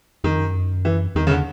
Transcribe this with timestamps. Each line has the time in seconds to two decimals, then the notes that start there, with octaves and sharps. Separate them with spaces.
0.24 F2 D#3
0.39 F#2
0.85 E3
1.15 E2 D#3
1.27 C#3
1.31 D3